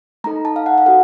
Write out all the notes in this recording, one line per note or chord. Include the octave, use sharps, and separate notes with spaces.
A3 D#4 A4 A#5
A5
F5
F#5
F5
F#4 A4 F#5